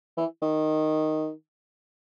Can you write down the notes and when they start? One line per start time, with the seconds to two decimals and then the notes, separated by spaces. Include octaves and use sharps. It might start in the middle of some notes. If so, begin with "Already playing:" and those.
0.17 E3
0.42 D#3